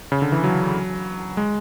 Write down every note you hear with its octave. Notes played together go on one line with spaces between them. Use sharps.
C#3
D3
E3
F#3
G#3